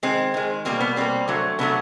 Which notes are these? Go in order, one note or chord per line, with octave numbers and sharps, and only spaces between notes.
D#3 G#3 C4
D#3 G#3
B2 G3 A#3 C4
B3
B2 G3 A#3 C4
D3 F#3 A3
D3 F#3 A3 B3